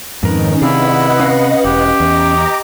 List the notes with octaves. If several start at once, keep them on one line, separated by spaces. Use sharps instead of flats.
F2 G#2 D#3 C#4 D#4 A#4 B4
C3 E4 G#4 B4 D5 D#5 F5 F#5
C#4 F5
E1 G4
E2 D#5 A#5 D6